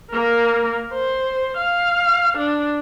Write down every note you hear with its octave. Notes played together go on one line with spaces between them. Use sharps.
A#3 A#4
C5
F5
D4